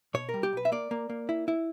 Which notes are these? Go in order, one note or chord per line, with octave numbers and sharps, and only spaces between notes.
B2 C#5
A#4
G3
G4
B1 B4
E5
A#3 D5
A#3
A#3
E4
E4